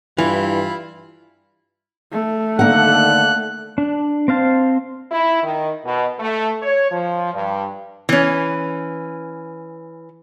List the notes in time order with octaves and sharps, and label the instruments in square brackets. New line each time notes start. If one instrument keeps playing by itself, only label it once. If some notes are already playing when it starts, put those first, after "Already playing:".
[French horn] G2 [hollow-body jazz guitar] E3 [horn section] E4 F4
[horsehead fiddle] A3
[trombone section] D3 D#3 D4 [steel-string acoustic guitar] A#3 F#5 [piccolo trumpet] F#6
[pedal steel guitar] D4
C4 C5 F5 A5
[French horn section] E4
D#3
B2
A3
C#5
F3
G2
[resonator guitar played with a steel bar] E3 C#4